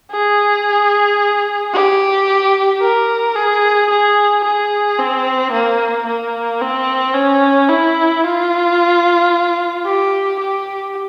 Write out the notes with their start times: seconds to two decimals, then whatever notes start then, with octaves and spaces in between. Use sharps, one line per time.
0.11 G#4
1.73 G4
2.81 A#4
3.36 G#4
3.90 G#4
4.44 G#4
4.99 C4
5.52 A#3
6.07 A#3
6.61 C4
7.14 C#4
7.69 E4
8.23 F4
9.86 G4
10.40 G4